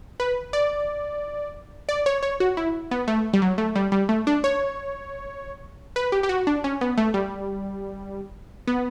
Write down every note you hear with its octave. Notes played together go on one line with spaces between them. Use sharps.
B4
D5
D5
C#5
C#5
F#4
E4
B3
A3
G3
F#3
A3
G3
G3
A3
D4
C#5
B4
G4
G4
F#4
D4
C#4
B3
A3
G3
B3